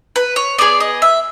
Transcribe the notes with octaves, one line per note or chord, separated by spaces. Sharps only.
B4
C#5
B3 E4 G#4 D5
D#5
E5